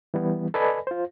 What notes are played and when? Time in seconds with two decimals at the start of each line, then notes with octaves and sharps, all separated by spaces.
0.14 E3 G3 B3
0.54 A4 B4 D5 D#5 G#5 B5
0.87 F4 C5